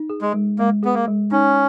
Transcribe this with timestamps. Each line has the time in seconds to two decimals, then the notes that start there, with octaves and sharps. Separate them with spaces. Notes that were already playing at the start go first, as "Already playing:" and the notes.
Already playing: D#4
0.10 G#4
0.22 G#3
0.34 G#3
0.59 G#3 A#3
0.83 B3 G#4
0.94 A#3
1.08 G#3
1.31 C#4 D#4